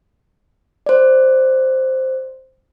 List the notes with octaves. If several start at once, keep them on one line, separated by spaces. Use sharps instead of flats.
C5 D5